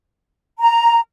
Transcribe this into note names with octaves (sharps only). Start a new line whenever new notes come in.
A#5